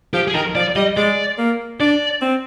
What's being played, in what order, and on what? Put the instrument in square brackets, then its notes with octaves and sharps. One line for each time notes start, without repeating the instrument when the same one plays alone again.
[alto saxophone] F3 [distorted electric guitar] G4
[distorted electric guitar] G#4
[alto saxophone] D#3 [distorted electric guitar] A#4
[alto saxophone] F3 [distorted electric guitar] D5
[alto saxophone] G3 [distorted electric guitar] D#5
[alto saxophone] G#3 [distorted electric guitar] D5
[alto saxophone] A#3
[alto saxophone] D4 [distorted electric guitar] D5
[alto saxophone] C4